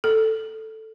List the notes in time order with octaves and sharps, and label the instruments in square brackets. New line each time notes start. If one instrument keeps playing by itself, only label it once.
[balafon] A4